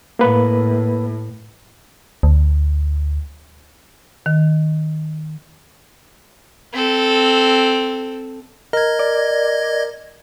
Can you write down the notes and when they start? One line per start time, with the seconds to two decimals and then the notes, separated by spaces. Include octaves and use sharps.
0.19 A2 A#3 B4
2.23 D2
4.26 D#3
6.73 C4 A4
8.73 A#4 D#5 G#6
8.99 D5